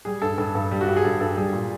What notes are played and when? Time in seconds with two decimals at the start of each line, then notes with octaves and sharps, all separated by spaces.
0.05 G3 G#4
0.22 G2 A4
0.38 G2 A4
0.55 G2
0.71 G3
0.81 F#4
0.88 G2 G4
0.97 G#4
1.04 G2 A4
1.20 G2 A4
1.37 G3 G#4
1.53 A#2